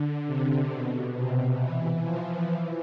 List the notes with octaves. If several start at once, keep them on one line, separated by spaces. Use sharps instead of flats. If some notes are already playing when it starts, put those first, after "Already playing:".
Already playing: D3
C3
B2
C3
E3
F3
E3